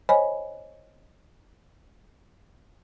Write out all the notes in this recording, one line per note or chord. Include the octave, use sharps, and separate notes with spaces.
C5 C#5 D#5 G#5 B5